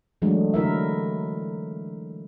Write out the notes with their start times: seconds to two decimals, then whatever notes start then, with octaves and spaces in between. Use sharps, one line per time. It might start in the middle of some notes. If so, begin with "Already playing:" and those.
0.22 E3 F#3 G#3 A3 D4
0.54 D3 E4 A#4 E5